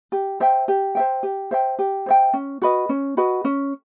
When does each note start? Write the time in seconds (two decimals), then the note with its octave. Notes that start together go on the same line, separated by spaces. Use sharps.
0.12 G4
0.40 C5 E5 G5
0.68 G4
0.95 C5 E5 G5
1.23 G4
1.51 C5 E5 G5
1.79 G4
2.06 C5 E5 G5
2.33 C#4
2.62 F#4 B4 D#5
2.89 C#4
3.17 F#4 B4 D#5
3.45 C#4